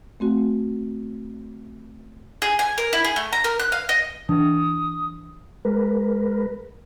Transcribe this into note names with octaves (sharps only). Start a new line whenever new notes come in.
A3 C4 F#4
G#4
G#5
A#4
E4
G#4
A3
A#5
A#4
F#6
F5
D#5
E3 D4 D#6
G#3 A#4 B4